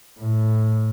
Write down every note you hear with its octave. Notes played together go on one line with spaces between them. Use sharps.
A2